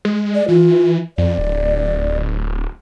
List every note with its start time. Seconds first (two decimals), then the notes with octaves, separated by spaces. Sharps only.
0.05 G#3
0.35 D5
0.48 E3 F4
1.18 F2 D5
1.38 D1